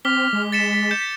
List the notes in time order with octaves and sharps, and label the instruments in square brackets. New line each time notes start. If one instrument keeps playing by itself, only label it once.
[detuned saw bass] C4 [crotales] D6 B6 G7 [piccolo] F6
[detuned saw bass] G#3
[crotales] A6 C#7 E7 [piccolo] B6
[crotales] G6 C#7 E7